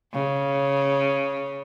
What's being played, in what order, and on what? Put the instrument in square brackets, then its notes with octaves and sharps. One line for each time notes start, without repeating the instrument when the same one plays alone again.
[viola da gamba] C#3